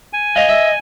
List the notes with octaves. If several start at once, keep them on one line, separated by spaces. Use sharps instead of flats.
G#5
D#5 F5
E5